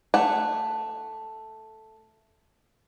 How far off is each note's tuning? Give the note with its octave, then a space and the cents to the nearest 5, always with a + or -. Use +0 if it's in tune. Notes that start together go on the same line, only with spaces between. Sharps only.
A3 +0 F#5 +0